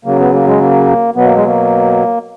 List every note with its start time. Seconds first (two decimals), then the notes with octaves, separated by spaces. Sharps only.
0.05 C#3 F#3 A#3
0.19 B3
0.33 A#3
0.47 G#3
0.61 A#3
1.16 B2 F#3 B3
1.25 A#3
1.35 G#3
1.46 A#3